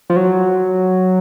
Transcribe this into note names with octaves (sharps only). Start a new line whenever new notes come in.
F3
F#3